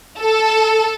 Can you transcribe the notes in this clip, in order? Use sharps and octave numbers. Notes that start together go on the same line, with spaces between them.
A4